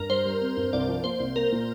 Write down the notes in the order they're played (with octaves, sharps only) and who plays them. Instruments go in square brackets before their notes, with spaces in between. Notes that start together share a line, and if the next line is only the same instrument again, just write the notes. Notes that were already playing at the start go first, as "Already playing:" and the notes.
Already playing: [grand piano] G2 [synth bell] A#4
[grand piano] G3 [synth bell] C5
[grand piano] G3
C4
G2
[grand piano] C2 [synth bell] D5
[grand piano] F3
[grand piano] A#3 [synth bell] C5
[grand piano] C2
[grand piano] A#3 [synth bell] A#4
[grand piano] A#2